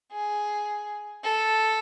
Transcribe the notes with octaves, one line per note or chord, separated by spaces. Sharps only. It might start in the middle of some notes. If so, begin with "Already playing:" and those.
G#4
A4